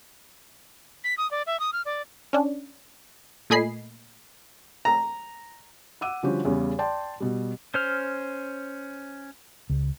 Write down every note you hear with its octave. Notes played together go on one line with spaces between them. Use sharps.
B6
D#6
D5
E5
D#6
F6
D5
C#4 D4
A#2 A3 D#5 G#5 B5 C7
A#5
F#5 D6 E6 D#7
D3 F3 G3 C#4 F#4 G4
E2 C#3 G3
D5 G5 A5 C6
B2 G3
C#4 C5 F6
C#2